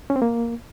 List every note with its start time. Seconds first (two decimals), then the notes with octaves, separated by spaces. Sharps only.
0.10 C#4
0.16 C4
0.22 A#3